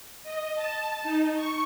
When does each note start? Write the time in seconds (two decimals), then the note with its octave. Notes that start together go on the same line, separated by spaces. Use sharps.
0.23 D#5
0.55 A5
1.03 D#4
1.34 C#6